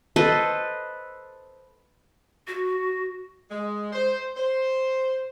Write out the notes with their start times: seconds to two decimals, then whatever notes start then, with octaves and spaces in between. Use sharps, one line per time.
0.16 A4 B4 C5 D#5
2.47 F#4
3.51 G#3
3.92 C5
4.37 C5